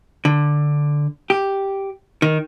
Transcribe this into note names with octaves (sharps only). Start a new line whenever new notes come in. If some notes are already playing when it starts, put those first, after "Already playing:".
D3
G4
D#3